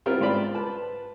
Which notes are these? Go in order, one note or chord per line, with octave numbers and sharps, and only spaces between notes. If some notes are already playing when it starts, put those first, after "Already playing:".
G3 B3 C4 E4 F4 A#4
G#2 F4 C5 D5 B5
B4 A5